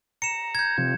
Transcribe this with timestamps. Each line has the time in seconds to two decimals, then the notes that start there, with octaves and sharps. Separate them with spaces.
0.22 A#5 C#7 E7
0.55 G6 G#6
0.78 C3 F3